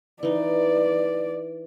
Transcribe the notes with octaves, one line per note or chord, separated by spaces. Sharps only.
E3 D#4 D5